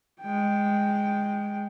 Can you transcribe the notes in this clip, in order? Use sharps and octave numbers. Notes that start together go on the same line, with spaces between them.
G#3 G5